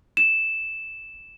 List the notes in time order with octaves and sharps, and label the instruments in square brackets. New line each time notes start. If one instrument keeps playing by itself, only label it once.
[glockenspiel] E7